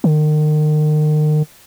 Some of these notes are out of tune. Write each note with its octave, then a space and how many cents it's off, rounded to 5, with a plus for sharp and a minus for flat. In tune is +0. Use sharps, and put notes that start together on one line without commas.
D#3 -35